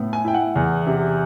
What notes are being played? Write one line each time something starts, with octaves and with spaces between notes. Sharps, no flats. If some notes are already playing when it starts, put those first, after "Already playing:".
Already playing: A2 B3
G#5
E4 G5
F#5
E2
C3